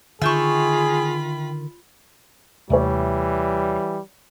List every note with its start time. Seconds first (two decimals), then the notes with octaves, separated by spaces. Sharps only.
0.22 D3 D#3 F4 G#4 E5 G5 B5 C#6
2.70 D#2 C3 E3 G3 A3 C#5 D5 E5